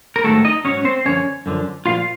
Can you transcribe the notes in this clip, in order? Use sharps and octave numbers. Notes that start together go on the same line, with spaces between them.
A#4
G#2 D#3 F#3 A3 A4
D#4 D#5
G#2 D#3 F#3 C#4 C#5
C4 C5
F#2 D3 F3 C#4 C#5
F#2 D3 F3
A#2 F3 F4 F5